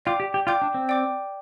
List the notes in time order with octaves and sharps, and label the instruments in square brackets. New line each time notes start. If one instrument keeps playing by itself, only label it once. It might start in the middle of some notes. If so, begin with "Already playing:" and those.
[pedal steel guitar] F4 [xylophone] D5 G5 D6 G6
[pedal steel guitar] G4
G4
[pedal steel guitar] F4 [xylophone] D5 G5 D6 G6
[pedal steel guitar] D4
C4
[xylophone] D5 G5 D6 G6